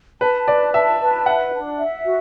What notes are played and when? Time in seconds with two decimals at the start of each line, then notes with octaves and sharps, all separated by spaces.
0.21 B4 A5
0.47 B4 D5
0.74 E5 A5
1.00 B4
1.26 E5 F#5
1.53 D4
1.78 E5
2.05 F#4